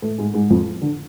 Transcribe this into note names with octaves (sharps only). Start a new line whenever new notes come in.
A2 A3
G#2 G#3
G#2 G#3
F2 F3
D3